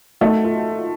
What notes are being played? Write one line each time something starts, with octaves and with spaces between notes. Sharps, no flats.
A3 D#4 F#4
F4 A4